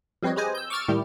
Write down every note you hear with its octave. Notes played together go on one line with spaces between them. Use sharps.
F3 G3 C4 B4 C#5 D#5
G4 G#4 B4 C5 D#5 G#5
E6 G6
C#6 D6 E6 F6 A6 D7
A2 D#3 G3 E4 G4